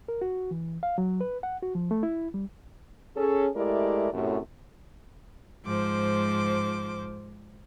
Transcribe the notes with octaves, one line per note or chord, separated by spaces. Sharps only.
A#4
F#4
E3
F5
F#3
B4
F#5
F#4
F3
A3
E4
G3
C#4 G#4 A4
G#3 A3 E4 G4 A#4 D5
F#2 A2 C3
G#2 F3 C5 D6